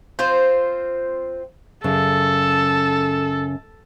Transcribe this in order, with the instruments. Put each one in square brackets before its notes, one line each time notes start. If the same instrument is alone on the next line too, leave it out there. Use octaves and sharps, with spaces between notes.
[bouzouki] C4 F4 C5
[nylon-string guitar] F#2 C#3 [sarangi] A4